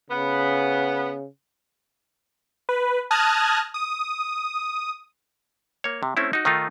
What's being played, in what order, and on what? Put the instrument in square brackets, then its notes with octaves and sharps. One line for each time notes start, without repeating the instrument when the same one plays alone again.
[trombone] C#3 [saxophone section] B3
[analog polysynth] B4
A5 D#6 F6 F#6 G#6 A#6
D#6
[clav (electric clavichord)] A#3 C#5
C3
A3 C4 C#4 E4
D#4 F#4
D#3 A3 D#4 F4